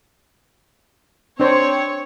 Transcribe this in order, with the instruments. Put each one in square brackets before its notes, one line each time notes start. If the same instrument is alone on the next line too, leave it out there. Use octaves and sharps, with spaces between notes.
[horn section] C4 [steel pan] D4 C5 [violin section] C#5